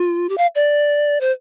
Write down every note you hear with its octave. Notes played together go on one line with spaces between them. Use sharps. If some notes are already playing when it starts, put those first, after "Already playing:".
Already playing: F4
G4
F5
D5
C5